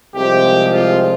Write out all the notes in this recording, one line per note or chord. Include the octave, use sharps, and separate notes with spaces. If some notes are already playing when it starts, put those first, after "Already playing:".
C2 C3 F3 G#3 G4
F4